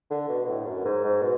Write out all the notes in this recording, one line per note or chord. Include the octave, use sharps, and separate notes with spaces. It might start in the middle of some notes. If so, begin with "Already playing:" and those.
D3
B2
B2
A2
F#2
G#2
G#2
B2